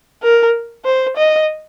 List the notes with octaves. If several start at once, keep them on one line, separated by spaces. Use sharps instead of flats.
A#4
C5
D#5